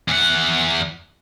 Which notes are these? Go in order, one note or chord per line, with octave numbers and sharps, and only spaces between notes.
E2 F#5